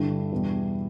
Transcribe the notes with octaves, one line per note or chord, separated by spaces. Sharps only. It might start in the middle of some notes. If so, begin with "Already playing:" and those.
Already playing: G2 D3 G3 E4
E2 B2 G3